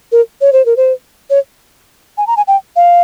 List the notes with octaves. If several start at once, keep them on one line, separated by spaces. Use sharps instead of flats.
A#4
C#5
C5
A#4
C5
C#5
G#5
A#5
G#5
G5
F5